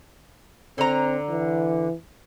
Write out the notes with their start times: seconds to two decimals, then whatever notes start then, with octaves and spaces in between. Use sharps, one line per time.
0.78 D3 C4 A#5
1.29 E3